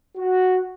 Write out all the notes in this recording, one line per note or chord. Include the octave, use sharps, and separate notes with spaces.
F#4